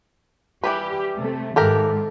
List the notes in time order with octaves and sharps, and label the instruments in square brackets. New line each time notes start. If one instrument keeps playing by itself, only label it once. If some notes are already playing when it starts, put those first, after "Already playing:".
[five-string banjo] E3 G3 B4 [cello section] G4
[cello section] C3 A3
[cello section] G#2 D#3 [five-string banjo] E3 G4 A#4 [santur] A4